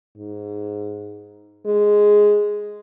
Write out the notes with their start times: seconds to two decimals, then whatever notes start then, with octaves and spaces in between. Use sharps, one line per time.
0.18 G#2
1.66 G#3